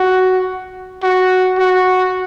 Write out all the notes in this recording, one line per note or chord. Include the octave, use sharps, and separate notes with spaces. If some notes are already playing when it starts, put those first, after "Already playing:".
Already playing: F#4
F#4
F#4